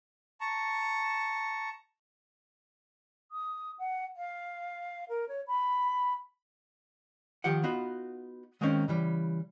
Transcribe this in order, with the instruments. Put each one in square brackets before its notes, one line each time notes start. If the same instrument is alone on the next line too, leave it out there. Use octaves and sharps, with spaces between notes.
[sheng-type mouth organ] A5 A#5 C#6
[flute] D#6
F#5
F5
A#4
C#5
B5
[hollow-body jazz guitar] D#3 F3 G4 F#5
B3 D#4 F4 F#4
D#3 G#3 A#3 C4 C#4 D#4
C#3 E3 G3